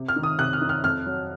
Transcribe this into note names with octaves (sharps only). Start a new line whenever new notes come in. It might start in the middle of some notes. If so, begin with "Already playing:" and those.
Already playing: C3
F6
D#3
D#6
C3 F#6
F6
D#3
F6
F2 F6
F#3